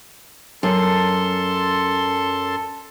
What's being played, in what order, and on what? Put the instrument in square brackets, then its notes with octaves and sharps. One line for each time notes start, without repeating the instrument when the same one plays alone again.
[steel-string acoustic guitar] F#2 [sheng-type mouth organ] A4 A5 C6